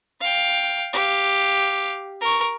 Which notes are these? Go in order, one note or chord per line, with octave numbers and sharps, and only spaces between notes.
F5 G5
G4 F5
A#4 C#6